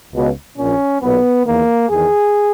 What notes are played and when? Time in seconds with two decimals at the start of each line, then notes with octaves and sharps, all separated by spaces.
0.13 C#2 B2
0.57 A#1 A#2 C#4
1.01 B1 A#2 B3
1.46 E2 D#3 A#3
1.90 E2 D#3 G#4